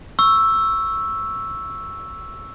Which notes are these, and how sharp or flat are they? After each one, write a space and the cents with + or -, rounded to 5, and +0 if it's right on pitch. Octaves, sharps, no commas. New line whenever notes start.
C#6 +0 E6 +0